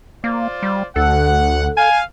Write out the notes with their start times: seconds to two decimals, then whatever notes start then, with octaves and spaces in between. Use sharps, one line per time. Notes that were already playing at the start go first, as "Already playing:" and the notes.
0.24 A#3 F4 C5 D5
0.63 G3
0.96 D2 A4 F#5
1.77 F5 G#5